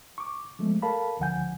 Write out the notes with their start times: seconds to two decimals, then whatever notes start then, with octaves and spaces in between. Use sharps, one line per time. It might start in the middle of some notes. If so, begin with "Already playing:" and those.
0.18 C#6 D6
0.59 F3 G#3 A3 B3
0.82 A4 A#4 F5 A5 B5
1.19 C#2 D3 F3 F#5 G#5 G6